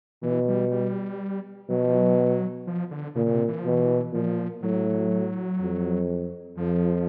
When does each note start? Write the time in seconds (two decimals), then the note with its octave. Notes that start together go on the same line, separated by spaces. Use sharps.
0.22 B2 E3
0.48 G3
0.71 G3
1.69 B2 F#3
1.82 F3
1.96 F#3
2.67 F3
2.91 D3
3.15 A#2 C#3
3.26 C#3
3.32 C3
3.48 E3
3.59 F3
3.65 B2
3.71 E3
4.13 A#2 F3
4.62 A2 F#3
5.61 F2
6.57 F2 F3